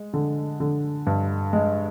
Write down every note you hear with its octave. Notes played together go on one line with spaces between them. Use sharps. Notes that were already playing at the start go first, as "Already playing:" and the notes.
Already playing: G#3
D3
D3
G2
G#3